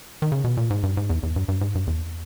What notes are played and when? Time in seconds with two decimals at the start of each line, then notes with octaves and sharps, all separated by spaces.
0.22 D#3
0.32 C#3
0.44 B2
0.57 A#2
0.70 G#2
0.83 G2
0.97 G#2
1.10 E2
1.23 E2
1.36 G2
1.48 G2
1.61 G#2
1.75 G2
1.87 E2